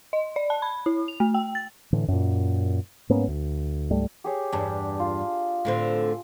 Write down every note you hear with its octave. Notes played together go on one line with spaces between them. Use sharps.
D#5
D5
A5
B5
E4
F7
A3
G5
A6
A2 D3 E3
F#2 A#2
G#2 A#3 B3 C#4
D2
C#2 G#2 G3 A3
G4 G#4 C#5
E2 G2 D4
F4
A2 D3 C4